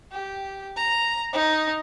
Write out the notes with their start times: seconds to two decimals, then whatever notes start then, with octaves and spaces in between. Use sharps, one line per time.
0.12 G4
0.76 A#5
1.33 D#4